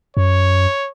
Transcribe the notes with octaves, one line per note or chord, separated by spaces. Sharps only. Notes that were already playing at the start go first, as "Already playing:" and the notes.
F#2 C#5